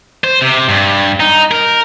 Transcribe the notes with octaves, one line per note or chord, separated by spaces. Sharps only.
C5
C3
G2
D#4
A#4